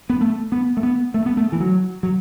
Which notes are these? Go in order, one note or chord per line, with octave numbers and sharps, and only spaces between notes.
B3
A3
B3
A3
B3
A3
B3
A3
E3
F#3
F#3